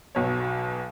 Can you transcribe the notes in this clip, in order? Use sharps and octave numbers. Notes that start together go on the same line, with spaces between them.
B1 B2 F#3 C#5